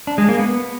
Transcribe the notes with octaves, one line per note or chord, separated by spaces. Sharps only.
D4
G#3
A#3
B3